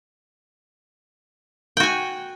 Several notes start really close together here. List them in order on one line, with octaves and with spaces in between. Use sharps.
G5 F#4 G#5